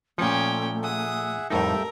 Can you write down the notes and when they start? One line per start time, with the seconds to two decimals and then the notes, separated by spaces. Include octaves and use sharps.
0.18 A#2 F3 A3 C#4 G5
0.84 G#4 E5 F#5 D#6
1.50 F2 A2 G3 D#4 A4 A#4 E5 G5